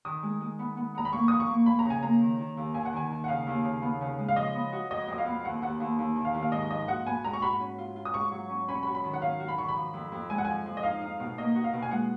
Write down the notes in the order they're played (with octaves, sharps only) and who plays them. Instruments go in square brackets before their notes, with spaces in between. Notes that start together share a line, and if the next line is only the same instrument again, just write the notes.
[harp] D#3 [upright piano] D#6
[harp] G#3
G#3
B3
B3
[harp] B3 [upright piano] A#5
[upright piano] B5
[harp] A#3 [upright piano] C#6
[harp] F3 [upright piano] D#6
[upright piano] C#6
[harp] A#3
[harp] A#3 [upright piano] B5
[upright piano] A#5
[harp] C#3
[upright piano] G#5
[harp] A#3 [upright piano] A#5
[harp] D#3
D#3
D#2
[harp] D#2 [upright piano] G#5
[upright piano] F#5
[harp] D#3 [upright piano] G#5
[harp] D#3
[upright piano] F#5
[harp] C#3 [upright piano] F5
[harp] D#2
C#3
B3
C#3
G#3
[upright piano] F5
[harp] F3 [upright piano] D#5
[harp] B3
F#4
[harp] F2 [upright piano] D#5
[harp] F2 [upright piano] D#5
[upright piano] F5
[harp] B3
[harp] D#2 [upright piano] F#5
[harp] D#2 [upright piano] F#5
[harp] D#2
D#2
D#3
[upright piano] F5
[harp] D#2
[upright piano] F5
[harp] G#2 [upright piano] D#5
[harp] F3 [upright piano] D#5
[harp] F#4 [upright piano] F#5
[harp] B3 [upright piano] G#5
[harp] G#2 [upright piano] A#5
[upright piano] C#6
[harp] F#4 [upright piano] B5
[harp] C#4
F4
F4
[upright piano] D#6
[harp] G#2 [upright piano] C#6
[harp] F#3
C#4
[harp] C#4 [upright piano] B5
[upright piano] C#6
B5
[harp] F#4
[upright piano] B5
[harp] D#3
[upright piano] F#5
[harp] C#4 [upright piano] F5
[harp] F#4
[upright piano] B5
[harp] D#3 [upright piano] C#6
[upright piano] B5
[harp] F3
F2
F2
[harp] G#3 [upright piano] G#5
[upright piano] F#5
[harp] F3 [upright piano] G#5
[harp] F3
[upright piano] D#5
[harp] D#4 [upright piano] F5
[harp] D#4
B2
[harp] A#3 [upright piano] D#5
[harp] F#4
[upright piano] F5
[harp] B2
[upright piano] G#5
[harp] G#3 [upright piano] F#5